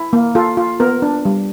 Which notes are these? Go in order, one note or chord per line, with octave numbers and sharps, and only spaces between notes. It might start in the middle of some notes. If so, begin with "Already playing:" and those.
Already playing: E4
A#3
F4 A4
F4
B3 A#4
D4
G3